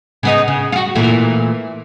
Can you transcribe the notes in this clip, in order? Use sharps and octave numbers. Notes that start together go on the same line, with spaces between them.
C#3 B3 D#4
C#3
F4 F#4
A#2 E3 A3